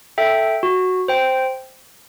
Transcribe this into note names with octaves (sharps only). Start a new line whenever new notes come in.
A4 E5 G5
F#4
C5 G5